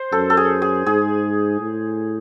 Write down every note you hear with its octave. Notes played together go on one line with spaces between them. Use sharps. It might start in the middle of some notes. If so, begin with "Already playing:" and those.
Already playing: C5
F#2 A4
A4
G#4
G#4
G#2 G#4
A2